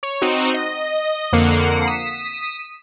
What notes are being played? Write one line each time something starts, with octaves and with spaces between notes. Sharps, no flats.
C#5
C4 D#4 F#4
D#5
F2 D3 A#3 F#5 C7 C#7
D#6 B6 D#7 E7